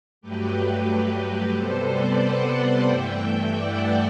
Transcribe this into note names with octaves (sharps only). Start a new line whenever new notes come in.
G2 F#3 A3 G4 B4
C3 G3 B3 A4 C5
B4 D5
D5 F#5
G2 E3 A3 E5 G5
D5 F#5